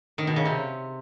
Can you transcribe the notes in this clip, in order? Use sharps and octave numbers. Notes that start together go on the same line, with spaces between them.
D#3
B2
C#3
C3